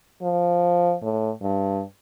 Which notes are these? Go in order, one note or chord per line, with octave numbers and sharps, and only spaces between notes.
F3
A2
G2